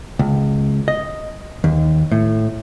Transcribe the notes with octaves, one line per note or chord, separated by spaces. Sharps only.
C#2
D#5
D#2
A2